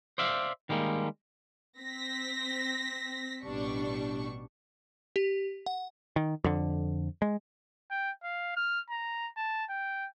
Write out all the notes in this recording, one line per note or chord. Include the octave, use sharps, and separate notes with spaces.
C5 D5 E5 F5
D#3 G3 G#3 A#3
C4 A#6 B6
A1 B2 G3 D4 C#6
G4
F#5
D#3
F2 D3
G#3
G5
F5
F6
A#5
A5
G5